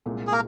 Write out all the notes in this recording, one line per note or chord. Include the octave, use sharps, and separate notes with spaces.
C2 A#2 G#3
G#4
A#3 A#4